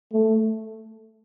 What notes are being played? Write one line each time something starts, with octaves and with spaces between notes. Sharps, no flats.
A3